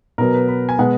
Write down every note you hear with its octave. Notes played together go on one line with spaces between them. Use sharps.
B2 F#3 B3 A#4
B4
B4
G#5
B2 G#3 B3 F#5